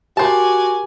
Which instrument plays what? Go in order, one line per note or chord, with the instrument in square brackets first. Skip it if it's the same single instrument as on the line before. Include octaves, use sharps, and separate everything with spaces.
[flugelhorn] F#4 [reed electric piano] G4 A#4 [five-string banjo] C5 A5 [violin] D5 G#5